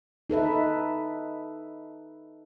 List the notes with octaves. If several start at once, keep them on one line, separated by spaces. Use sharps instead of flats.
D#4 A4 B4 E5